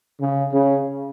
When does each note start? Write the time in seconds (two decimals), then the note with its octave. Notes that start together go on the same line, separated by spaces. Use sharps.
0.21 C#3
0.54 C#3